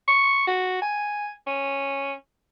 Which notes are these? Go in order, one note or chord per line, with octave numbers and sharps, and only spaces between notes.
C#6
F#4
G#5
C#4